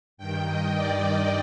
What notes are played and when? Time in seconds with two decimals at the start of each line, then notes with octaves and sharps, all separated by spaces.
0.17 G2 D#3 G5
0.46 D#5
0.75 D5